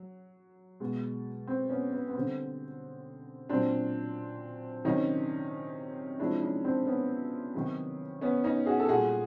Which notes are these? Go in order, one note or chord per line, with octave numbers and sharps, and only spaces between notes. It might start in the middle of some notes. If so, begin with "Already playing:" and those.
Already playing: F#3
B2 G#3
C4
B3 C#4
B3
B3
D3 G3 C4
A#2 F#3 C4 D4
C3 D#3 F#3 C#4 D#4
C3 F3 G#3 D4 E4
C#4 D#4
C4 D4
B3 C#4
C3 D#3 F#3
B3 C#4
C#4 D#4
F#4 G#4
A4
A#2 G3 F#4 G#4